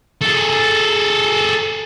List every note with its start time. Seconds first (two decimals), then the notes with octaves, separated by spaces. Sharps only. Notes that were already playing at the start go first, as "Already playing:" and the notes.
0.21 G#4 A4